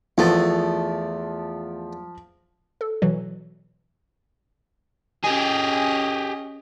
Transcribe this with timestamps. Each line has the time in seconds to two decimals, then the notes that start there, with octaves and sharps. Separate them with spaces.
0.18 E2 F3 A3
2.81 A4
3.02 B2 E3 F#3
5.24 C#4 G4 G#4 D#5